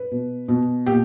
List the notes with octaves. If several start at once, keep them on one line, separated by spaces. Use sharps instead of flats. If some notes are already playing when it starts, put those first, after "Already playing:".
Already playing: B4
B2
B2
A#2 G4